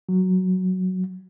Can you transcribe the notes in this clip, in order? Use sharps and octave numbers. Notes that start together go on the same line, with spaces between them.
F#3